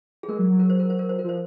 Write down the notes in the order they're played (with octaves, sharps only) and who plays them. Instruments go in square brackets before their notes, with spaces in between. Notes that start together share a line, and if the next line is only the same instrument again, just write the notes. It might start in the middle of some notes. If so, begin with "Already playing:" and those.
[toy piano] G#4
[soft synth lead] G#3 [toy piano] A#4
[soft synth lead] F#3
F#3
[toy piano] A#4
C5
A#4
C5
A#4
C5
[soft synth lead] F3 [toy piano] A#4
[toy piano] C5